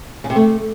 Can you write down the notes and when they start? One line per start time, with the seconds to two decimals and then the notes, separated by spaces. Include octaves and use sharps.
0.24 C#3
0.30 C3
0.36 A3